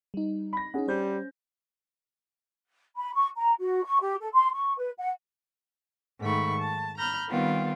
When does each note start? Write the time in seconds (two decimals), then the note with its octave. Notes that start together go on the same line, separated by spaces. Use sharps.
0.14 G3 D#4
0.53 B5 A#6
0.74 C#4 D#4 G#4 F#5
0.88 G3 C#4 C5 G6
2.96 B5
3.14 C#6
3.36 A#5
3.59 F#4
3.84 C#6
4.00 G4
4.20 A4
4.32 C6
4.52 C#6
4.77 B4
4.98 F#5
6.20 G#2 D#3 A3 B5 C#6
6.61 A5
6.98 A#5 B5 F6 G6
7.29 D#3 G3 B3 C4 F4